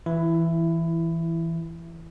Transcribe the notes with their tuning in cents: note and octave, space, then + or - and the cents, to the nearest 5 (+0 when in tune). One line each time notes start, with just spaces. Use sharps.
E3 +0 E4 +15